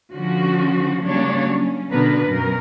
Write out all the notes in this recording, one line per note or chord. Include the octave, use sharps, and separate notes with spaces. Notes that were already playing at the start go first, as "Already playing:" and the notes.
D3 F3 C#4 F#4
C#3 F#3 G3 A#3 D4 C#5
C#4
B2 D3 B3 D4 A#4 B4
F#2 B2 A#4